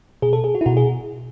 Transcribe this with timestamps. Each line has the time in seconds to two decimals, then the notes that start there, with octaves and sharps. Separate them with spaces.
0.22 B2 G#4
0.33 A4
0.44 G#4
0.55 F#4
0.61 E4
0.66 B2 F#4
0.77 G#4